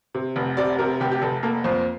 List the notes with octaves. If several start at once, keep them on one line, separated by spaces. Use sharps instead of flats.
C3
F1
C3 D5
C3 A#4
F1 G4
G4
F1 A4
A#3 A4
F2 C5